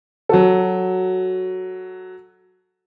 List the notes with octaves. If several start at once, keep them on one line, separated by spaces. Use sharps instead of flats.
F#3 F#4 A4